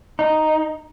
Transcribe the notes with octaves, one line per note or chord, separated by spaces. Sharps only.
D#4